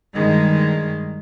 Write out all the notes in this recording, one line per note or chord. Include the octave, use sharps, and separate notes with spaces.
G2 D#3 G#3